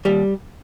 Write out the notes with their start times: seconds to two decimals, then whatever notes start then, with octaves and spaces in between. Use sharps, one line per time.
0.05 D#2 G3 G4